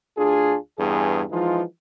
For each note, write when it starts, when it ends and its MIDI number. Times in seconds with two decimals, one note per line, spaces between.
0.18 0.56 38
0.18 0.56 62
0.18 0.56 65
0.18 0.56 68
0.79 1.23 40
0.79 1.23 43
0.79 1.23 68
1.31 1.63 52
1.31 1.63 53
1.31 1.63 56
1.31 1.63 63
1.31 1.63 65